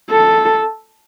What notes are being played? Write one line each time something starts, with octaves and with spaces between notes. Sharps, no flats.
A4